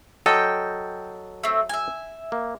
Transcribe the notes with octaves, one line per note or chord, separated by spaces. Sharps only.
F#3 A4 D#5 G5
A3 C4
E5 G#5
A#3